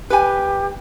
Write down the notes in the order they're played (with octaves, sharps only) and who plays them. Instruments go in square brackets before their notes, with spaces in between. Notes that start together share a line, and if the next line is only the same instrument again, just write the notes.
[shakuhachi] G4 [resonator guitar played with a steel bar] B4 G#5